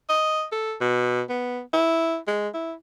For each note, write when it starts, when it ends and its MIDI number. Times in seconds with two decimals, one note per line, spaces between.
0.09 0.45 75
0.52 0.75 69
0.81 1.22 47
1.29 1.60 59
1.74 2.17 64
2.27 2.48 56
2.54 2.73 64